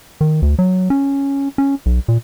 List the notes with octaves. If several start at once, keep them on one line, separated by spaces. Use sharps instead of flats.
D#3
D2
F#3
C#4
C#4
B1
A#2